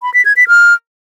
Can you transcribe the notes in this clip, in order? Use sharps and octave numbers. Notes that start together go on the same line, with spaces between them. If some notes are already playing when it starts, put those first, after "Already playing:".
B5
B6
G#6
B6
F6